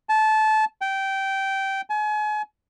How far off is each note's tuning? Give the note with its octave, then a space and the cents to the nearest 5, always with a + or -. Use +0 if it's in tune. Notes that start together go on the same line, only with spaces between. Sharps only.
A5 -20
G5 -15
G#5 +35